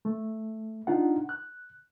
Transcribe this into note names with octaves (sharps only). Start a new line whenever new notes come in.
A3
D4 D#4 F4 F#5
F#6